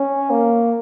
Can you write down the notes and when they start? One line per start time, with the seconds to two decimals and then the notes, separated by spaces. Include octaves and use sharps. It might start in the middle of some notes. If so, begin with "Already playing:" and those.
Already playing: C#4
0.30 A#3